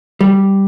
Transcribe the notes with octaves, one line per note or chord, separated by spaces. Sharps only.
G3